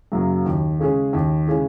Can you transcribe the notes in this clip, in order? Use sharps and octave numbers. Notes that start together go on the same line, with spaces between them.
F#2 C#3 F#3 A#3
D#2
C#3 G#3 C#4 G#4
D#2
C#3 G#3 C#4 G#4